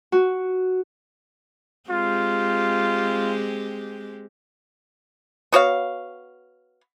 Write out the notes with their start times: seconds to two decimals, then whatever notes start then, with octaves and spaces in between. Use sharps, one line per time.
0.12 F#4
1.90 G#3 C4 F4 G4
5.52 B3 F#4 C#5 F5